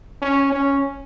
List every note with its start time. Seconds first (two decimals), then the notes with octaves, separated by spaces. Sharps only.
0.22 C#4
0.52 C#4